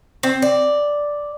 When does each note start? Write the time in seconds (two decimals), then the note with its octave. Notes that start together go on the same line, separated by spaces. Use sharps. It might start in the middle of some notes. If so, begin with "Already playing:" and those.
0.23 C4
0.42 D5